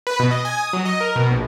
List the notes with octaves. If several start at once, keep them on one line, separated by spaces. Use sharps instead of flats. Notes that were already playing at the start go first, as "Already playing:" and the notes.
B4
B2
D#5
G#5
D#6
F#3
D#5
A#4
B2
A#1